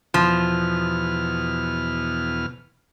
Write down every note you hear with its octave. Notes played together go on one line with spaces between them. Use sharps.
E2 B2 F3 F6